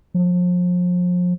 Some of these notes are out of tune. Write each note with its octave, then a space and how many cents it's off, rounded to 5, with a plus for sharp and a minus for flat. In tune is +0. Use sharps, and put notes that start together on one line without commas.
F3 +35